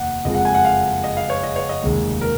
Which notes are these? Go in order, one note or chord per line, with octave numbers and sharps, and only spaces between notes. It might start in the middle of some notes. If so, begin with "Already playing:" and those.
Already playing: F1 D#2 F#5
F#1 F2 F3 G#3 D#5
F#5
G#5
F#5
F5
D#5
F5
C#5
D#5
C#5
D#5
F1 D#2 C#3 G#3
A#4